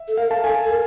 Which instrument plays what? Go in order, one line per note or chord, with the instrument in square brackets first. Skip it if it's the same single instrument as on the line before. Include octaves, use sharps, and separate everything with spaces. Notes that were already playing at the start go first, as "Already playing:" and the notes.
Already playing: [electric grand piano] E5
[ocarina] A4
[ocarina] A#4 [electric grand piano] F5
[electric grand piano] A5
[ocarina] A4 [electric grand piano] G#5
[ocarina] A4
A#4